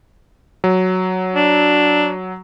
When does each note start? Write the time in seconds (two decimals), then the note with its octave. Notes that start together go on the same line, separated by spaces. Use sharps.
0.64 F#3
1.35 D4